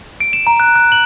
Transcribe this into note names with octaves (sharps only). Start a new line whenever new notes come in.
D7
E7
A#5
F#6
F#6
F#7